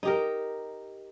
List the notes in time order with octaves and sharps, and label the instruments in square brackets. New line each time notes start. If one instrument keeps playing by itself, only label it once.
[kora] D#4 G4 A#4